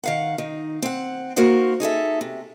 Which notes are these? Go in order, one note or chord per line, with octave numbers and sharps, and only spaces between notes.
D#3 F5 F#5
D#3 D#4
C4 F#5
A#3 D#4 F#4 A#4 C5 F#5
D#4 G#4 A4 E5
C3